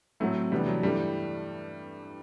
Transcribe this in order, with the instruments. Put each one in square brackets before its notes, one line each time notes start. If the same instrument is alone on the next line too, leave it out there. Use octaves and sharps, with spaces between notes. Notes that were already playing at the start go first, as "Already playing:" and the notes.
[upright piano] A2 F#3 C4 E4 [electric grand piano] A3
[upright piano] E2 C3 E3 B3 D4 [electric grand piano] G3
[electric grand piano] F#3
[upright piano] G2 E3 A3 D4 [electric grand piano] G3